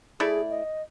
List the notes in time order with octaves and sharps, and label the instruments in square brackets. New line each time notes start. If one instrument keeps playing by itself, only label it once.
[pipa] A3 E4 D5 [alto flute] G#4
[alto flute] D#5